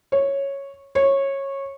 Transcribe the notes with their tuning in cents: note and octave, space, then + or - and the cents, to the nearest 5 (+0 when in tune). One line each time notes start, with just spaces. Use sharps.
C#5 -5
C#5 -15